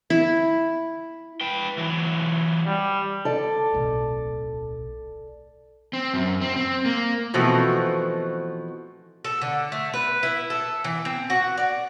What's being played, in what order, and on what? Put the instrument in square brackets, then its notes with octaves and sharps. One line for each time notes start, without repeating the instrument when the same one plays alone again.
[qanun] E4
[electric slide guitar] B4 G5
E3 F#3
[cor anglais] G3
[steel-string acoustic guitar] A4 D5
[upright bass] D1 B1
[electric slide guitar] C4
F#2
C4
C4
A#3
[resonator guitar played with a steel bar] B2 E3 F3 A3 C4 F#4
[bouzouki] A4
D3
A3
B4
E4
A4
E3
C4
F#4
D5